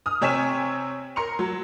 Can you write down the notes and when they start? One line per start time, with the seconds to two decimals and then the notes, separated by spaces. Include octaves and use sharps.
0.06 D#6 F6
0.21 C3 C4 C#5 G#5 B6 E7
1.16 A#4 C6 C#7 F7
1.39 F#3